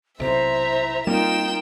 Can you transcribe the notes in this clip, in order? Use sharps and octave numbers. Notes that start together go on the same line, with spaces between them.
B1 C3 E4 C5 E5 A#5
G3 A#3 C4 D#4 F4 A#4 G5 E7